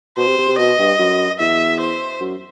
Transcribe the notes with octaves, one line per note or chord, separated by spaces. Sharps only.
B2 C5
C3
C3
C3
B2 D#5
G2
F#2
E2 E5
C5
F#2